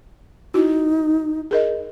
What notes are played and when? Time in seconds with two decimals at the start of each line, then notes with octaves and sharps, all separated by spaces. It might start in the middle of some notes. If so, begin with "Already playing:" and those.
0.54 D#4 E4 F#4
1.51 G#4 A#4 D#5